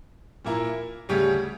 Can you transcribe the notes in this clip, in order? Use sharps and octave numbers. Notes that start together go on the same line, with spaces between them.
A#2 A#3 E4 A#4
D2 C#3 G3 C#4 G4